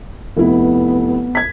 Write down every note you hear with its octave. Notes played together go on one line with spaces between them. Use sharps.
F1 B3 E4
G#6 B6